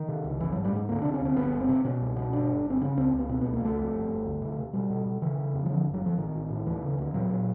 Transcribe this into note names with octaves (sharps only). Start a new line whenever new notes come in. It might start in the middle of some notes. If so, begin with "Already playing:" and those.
Already playing: D#3
C3
C#2
G#1 E3
G#2 F#3
G3
G#2 G#3
D2 A#3
C3 D4
C#4
D2 C4
G1 B3
G1
C4
C3
B2 C#4
C2
B2
G1 D4
G1
G1 C4
C#3 C#4
C#2 C4
C#2
B3
B2 C4
C#2 B3
A#3
C#2 A3
F2
G1
G1
D2
C3
C3
B2 G3
B2
B2
C#3 E3
C#3
F2
F#3
D3 F3
G1
F#3
F2 F3
A1 D#3
A1
A2
D2 E3
C#3
D2
A#2 F#3
A#2